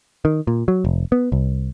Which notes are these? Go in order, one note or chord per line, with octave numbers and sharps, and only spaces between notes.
D#3
A#2
F#3
F1
B3
C2